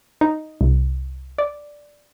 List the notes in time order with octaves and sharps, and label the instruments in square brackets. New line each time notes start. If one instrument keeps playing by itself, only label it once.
[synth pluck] D#4
C2
D5